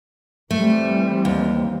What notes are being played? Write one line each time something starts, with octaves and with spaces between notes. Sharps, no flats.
E3 G3 A3 C4
D#2